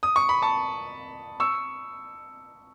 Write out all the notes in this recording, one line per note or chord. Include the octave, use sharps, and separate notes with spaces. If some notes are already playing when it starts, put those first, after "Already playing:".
D#6
C#6
B5
A5 C#6
C#6 E6